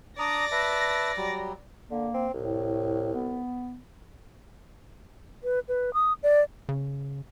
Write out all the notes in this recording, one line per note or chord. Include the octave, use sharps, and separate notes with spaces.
D4 D5 A#5 D#6 A#6
B4 E5 A5
F#3 G3
D3 A#3
C4
C2 A2
B3
B4
B4
D#6
D5
C#3